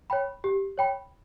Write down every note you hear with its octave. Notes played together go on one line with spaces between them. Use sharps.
C#5 G5 B5
G4
C#5 G5 B5